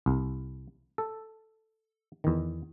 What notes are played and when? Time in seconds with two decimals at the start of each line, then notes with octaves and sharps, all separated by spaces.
0.06 C2
0.98 A4
2.24 E2 D#3